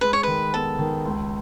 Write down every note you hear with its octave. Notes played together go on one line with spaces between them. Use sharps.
G#3 B4
C#5
D#3 B4
B3 A4
D#3
C#2